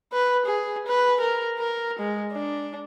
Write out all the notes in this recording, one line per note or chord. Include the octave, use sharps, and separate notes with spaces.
B4
G#4
B4
A#4
A#4
G#3
D4